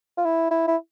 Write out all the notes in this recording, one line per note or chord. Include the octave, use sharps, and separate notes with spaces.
F4
E4
E4
E4